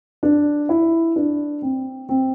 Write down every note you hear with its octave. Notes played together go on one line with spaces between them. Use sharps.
D4
E4
D4
C4
C4